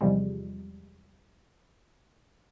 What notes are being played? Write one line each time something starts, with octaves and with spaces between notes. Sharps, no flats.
E2 C3 F3 G3 G#3